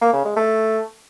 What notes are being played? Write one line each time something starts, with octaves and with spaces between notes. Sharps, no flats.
A#3
C#3
G#3
A3